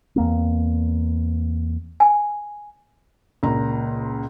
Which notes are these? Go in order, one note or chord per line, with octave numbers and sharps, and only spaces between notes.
E2 A#3 C4
G#5
C#2 A#2 A#5